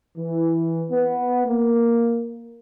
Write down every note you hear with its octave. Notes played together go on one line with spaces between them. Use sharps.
E3
B3
A#3